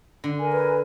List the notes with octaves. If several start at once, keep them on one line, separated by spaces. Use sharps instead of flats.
D3
A#4 G#5
B4